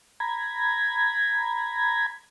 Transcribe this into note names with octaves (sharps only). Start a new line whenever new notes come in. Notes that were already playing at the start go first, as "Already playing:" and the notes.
A#5 B5 G#6